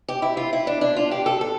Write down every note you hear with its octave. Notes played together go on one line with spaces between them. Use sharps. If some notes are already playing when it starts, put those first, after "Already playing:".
G4
E4
F4
E4
D4
D4
F4
G4
A4
A4